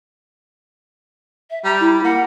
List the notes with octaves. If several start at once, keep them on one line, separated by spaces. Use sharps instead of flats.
E5
G3 A#5
E4
A#3 F#5